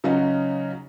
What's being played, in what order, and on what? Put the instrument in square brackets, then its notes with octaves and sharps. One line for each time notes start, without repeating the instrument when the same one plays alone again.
[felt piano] C#3 F#3 C#4 D#4 F4 F#4